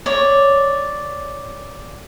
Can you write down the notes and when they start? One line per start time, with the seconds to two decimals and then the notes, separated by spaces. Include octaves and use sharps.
0.06 C#5 D5